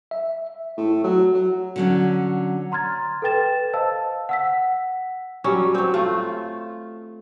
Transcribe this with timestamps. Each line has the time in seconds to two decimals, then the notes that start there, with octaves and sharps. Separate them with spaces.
0.11 E5
0.77 A2
1.04 F#3
1.34 F#3
1.76 D3 F#3 C#4
2.72 A#5 C6 F6 G#6 A6
3.22 A4 B4 G5 A6 E7
3.73 C5 D#5 F5 A5 E6
4.29 F#5 E6 B6
5.44 F#3 G3 C#4
5.74 F#3 C4
5.94 A3 F4